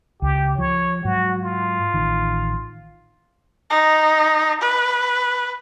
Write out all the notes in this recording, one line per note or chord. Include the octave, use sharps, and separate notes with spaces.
C#2 G4
F3 C#5
G#2 F#3 F#4
F4
A1 D#3
D#4
B4